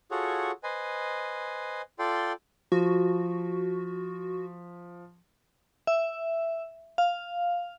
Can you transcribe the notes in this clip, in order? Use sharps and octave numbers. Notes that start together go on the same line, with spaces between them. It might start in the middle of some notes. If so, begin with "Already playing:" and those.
F4 F#4 G#4 A4 C#5 F#5
B4 C5 D#5 G#5
F4 A4 D5 G5 C6
F3 F#4
E5
F5